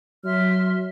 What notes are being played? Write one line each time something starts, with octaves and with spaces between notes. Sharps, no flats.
F#3 E5 C6 F6